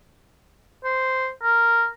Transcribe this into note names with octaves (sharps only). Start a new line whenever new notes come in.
C5
A#4